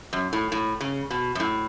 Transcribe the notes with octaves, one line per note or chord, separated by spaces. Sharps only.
F#2
A2
A2
C#3
B2
F#2
A2